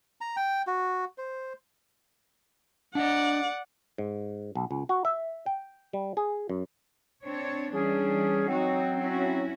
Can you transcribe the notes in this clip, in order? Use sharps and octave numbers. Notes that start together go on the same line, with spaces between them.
A#5
G5
F#4
C5
D4 D5 D#5 F#5
G#2
B1
C#2
F#4
E5
G5
G3
G#4
F#2
C4 D4 C#5
E3 G3 C#4 D4 G#4
F#3 C4 D#4 F#4
C#4 E4 F#4